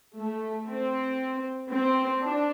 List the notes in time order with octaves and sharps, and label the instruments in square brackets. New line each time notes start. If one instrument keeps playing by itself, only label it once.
[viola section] A3
C4
C4
D4